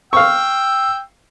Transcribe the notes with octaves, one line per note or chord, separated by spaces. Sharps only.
F5 G5 C#6 E6